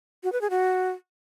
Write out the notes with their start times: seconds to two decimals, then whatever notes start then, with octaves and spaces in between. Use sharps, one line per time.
0.24 F#4
0.32 B4
0.41 G#4
0.50 F#4